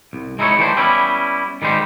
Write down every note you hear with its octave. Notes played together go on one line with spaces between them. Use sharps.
C2
G#3 D#4 E4 B4 C#5
E3 G3 A3 C5
G3 B3 C#4 E4
D#3 G3 G#3 C5